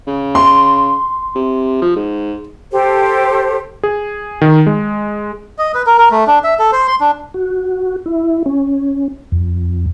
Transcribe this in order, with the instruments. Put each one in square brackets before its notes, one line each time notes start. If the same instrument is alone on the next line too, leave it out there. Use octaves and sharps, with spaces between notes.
[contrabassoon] C#3
[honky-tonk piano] C6
[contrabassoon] C3
F3
G#2
[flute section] G4 A4 C5
[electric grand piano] G#4
D#3
G#3
[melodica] D#5
B4
A#4
A#4
A3
D4
E5
A4
C5
C6
D4
[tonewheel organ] F#4
E4
C#4
F2